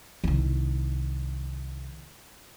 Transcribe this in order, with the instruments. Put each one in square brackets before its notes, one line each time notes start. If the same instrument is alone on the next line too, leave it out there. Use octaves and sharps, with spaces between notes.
[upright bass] C2 D#3